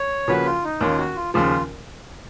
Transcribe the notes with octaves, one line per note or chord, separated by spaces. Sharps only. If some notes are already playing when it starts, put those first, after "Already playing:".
Already playing: C#5
C#3 F3 A#3 C#4 F#4 B4
F4
D#4
D#2 D#3 A#3 C#4 F4
F#4
F4
D#2 C#3 F3 F4